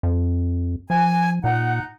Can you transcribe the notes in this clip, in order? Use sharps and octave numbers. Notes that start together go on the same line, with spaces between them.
F2
F3 G#5
A#2 D#4 F#5